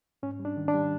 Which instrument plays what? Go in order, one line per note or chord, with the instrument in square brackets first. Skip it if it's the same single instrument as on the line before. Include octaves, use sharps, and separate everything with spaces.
[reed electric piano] G#2 C#4
G3
D4
D#3
D4
G3